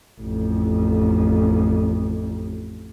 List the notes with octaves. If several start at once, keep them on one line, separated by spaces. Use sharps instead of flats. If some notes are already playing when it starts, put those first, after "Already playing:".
A1 F2